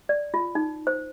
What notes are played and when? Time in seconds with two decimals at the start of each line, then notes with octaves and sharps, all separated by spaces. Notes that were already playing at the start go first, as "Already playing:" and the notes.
0.09 D5
0.34 F4
0.55 D#4
0.87 C5